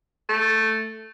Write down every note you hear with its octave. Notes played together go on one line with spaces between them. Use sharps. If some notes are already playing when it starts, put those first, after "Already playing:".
A3